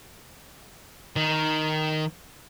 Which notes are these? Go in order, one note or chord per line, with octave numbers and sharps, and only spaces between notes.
D#3